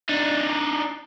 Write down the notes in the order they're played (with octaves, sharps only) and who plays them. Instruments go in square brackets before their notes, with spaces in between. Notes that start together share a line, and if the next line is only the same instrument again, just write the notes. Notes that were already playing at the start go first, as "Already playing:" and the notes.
[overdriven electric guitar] D4 D#4